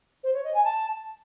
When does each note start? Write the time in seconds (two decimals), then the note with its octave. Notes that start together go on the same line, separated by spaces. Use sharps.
0.23 C5
0.34 C#5
0.44 D#5
0.54 G#5
0.64 A5